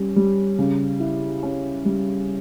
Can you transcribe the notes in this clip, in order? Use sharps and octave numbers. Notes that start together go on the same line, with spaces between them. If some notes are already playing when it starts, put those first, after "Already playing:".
Already playing: G3 C#4
G3
C#3
E4
C#4
G3